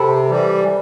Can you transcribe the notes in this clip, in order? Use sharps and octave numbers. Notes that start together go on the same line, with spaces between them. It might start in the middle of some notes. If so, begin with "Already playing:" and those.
Already playing: C3 A4 C5 G5 B5
E3 G3